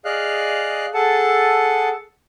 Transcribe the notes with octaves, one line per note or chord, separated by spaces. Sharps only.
G#4 D5 D#5 F5 F6 F#6
G#4 A4 F#5 A5